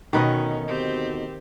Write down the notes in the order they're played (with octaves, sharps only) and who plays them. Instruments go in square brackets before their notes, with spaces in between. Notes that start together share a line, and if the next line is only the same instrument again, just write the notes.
[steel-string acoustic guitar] D2 B2 D#4 [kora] D#3 B4 D#5 [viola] C#4
[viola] C4 G4